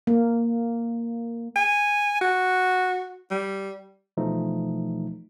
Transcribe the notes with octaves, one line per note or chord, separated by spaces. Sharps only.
A#3
G#5
F#4
G3
B2 E3 F3 A3 D#4